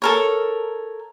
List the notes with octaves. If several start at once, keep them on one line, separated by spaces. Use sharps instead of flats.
A4 A#4 C#5